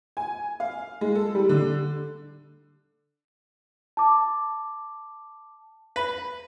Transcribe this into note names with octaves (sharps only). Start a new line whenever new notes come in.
G#5
F5
G#3
A4
G3
D3
A5 D6
B4